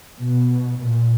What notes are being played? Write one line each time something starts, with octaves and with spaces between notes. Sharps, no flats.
B2
A#2